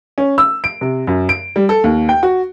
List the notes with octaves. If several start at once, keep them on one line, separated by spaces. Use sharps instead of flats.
C#4
E6
D7
C3
F#2
D7
G3
A4
D#2
G5
F#4